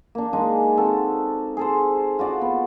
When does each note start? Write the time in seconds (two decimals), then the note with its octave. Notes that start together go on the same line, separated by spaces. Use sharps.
0.15 A#3 D4
0.33 G#3 D4 D#4 G#5
0.77 C4 F#4 A4
1.57 G#4 A4 C5
2.19 F4 F#4 D5 D#5
2.42 B3